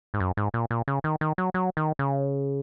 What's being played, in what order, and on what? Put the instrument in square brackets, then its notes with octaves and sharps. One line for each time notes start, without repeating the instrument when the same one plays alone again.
[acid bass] G#2
F#2
G#2
A#2
A#2
C#3
D#3
D#3
F#3
F#3
D#3
C#3